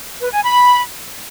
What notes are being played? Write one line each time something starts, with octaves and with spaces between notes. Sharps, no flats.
B4
G#5
B5